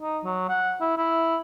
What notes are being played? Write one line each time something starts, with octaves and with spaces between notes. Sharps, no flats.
D#4
F#3
F#5
E4
E4